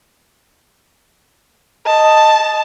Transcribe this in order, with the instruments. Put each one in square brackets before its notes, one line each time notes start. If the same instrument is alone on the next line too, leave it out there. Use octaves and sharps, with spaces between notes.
[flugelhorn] D#5 [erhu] A5